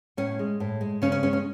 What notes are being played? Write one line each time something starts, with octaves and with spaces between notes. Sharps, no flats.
A2 C#4
G#3
A2
G#3
C#3 C#4
C#4
G#3 C#4
C#4